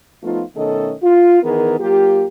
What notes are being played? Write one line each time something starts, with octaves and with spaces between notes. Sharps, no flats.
F3 A3 B3 D#4 F4
B2 D#3 A3 C#4 A4 D#5
F4
D#3 E3 B3 G#4 A#4
F#3 A#3 F4 G4